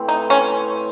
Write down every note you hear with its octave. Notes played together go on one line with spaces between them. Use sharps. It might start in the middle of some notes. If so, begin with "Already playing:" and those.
Already playing: A2 E3 A3 C4
D#4
C#4